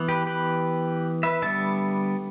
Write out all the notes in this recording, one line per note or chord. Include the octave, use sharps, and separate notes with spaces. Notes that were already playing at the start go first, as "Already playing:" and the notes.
Already playing: E3 B3
G4 B4
G4 B4
B4 E5
D3 G3 B3 E5 A5